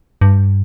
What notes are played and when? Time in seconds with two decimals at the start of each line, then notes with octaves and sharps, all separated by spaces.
0.21 G2